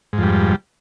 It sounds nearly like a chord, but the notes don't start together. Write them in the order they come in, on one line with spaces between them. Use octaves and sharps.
G#2 F2 G3